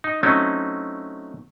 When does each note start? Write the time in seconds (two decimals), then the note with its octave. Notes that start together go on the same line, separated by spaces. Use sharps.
0.04 D#4
0.23 F#3 A3 C4 C#4 D#4 E4